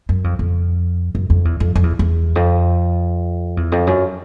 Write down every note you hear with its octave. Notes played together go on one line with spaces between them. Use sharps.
F#2
F2
F2
F#2
F2
E2
F2
F2
E2
E2
F2
E2
F2
F#2